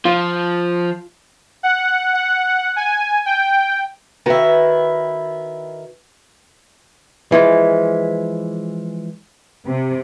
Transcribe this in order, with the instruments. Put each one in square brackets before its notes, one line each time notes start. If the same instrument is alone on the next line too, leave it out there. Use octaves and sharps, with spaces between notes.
[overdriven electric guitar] F3 [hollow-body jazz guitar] F4
[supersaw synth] F#5
F#5
G#5
G5
[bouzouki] D#3 E4 [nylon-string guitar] F#4 B4 G5
[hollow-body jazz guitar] E3 F3 G#3
[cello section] C3